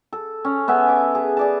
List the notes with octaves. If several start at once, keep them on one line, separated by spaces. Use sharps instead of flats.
A4
C#4
B3 A4 E5 G#5
D6
G#4
G#4 D5 A5